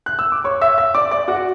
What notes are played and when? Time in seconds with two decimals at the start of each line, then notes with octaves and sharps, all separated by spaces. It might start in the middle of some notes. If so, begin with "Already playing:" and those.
0.06 F#6
0.19 E6
0.32 D6
0.44 C#5 C#6
0.61 E5 E6
0.78 E5 E6
0.95 D5 D6
1.11 D5 D6
1.28 F#4 F#5